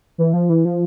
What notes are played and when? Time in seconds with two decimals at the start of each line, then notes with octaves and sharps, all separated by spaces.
0.18 E3
0.34 F3
0.49 E3
0.65 F3